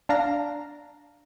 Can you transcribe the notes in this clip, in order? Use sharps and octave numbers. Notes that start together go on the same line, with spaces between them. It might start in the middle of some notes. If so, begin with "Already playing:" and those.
D4 F5 A#5